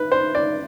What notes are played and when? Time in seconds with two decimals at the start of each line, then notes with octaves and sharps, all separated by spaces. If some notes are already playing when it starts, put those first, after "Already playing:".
Already playing: B4
0.12 C5
0.35 D5